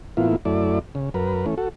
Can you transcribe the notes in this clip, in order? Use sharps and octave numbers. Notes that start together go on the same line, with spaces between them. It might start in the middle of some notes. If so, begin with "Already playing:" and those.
A2 E3 A#3 B3 E4 F4
F#2 A3 E4 D5
C#3
F#2 A#4 B4
E3 A3 C#4
F#4 A4